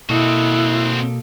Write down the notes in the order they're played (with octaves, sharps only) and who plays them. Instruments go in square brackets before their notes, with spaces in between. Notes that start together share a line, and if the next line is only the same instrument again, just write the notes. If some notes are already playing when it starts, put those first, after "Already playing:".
[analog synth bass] B2 [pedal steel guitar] A#3 A4 D#5 [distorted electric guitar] C4 F#4 [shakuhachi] E4